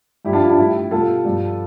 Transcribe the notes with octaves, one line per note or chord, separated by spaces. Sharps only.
G2 F3 E4 G4
D4 F4
E4 G4
D4 F4
A2 G3 E4 G4
B2 G3 F4 A4
G2 F3